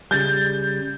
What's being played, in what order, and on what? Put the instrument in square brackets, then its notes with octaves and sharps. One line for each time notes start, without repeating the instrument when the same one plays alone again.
[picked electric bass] C#3 G3 [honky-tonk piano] G6 A6